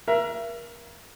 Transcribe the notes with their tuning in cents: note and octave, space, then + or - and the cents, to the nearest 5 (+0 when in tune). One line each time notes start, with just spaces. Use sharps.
A#4 +25 E5 +35